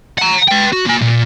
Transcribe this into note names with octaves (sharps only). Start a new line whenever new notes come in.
F#5 A#5
B4 G5
F#4
A#3 G#5
A#2